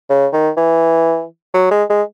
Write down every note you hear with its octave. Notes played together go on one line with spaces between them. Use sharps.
C#3
D#3
E3
F#3
G#3
G#3